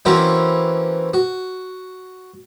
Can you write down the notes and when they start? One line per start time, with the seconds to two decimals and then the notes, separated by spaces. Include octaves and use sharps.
0.05 E3 A#3 C4 C#4 E4 F#4
1.13 F#4